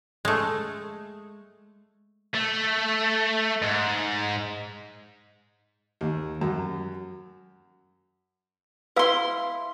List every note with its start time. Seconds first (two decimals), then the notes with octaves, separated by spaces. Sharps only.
0.25 G#3 A3
2.35 A3
3.62 G#2
6.01 D#2
6.41 F#2
8.96 E4 B4 F5 C6 E6